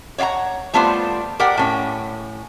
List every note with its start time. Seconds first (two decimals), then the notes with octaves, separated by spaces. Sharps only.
0.18 C#5 D5 F5 F#5 A#5
0.73 G3 A3 B3 F4 C5 D5
1.39 G4 A#4 D5 F#5 G5
1.57 A2 C#4